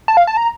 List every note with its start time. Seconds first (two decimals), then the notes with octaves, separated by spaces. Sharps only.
0.08 A5
0.17 F5
0.27 A5
0.37 A#5